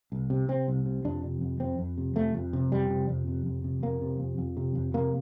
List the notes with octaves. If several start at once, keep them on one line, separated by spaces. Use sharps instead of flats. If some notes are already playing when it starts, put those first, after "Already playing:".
C2
C3
C3 C4
C2
C3
F2 D4
C3
F2
F2 C4
F2
C3
F2 A3
F2
C3
F2 G3
C3
F2
C3
F2
C3
F2 A#3
C3
F2
F2
C3
F2
C3 A#3